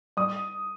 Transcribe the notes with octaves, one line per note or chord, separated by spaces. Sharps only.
G3 D#6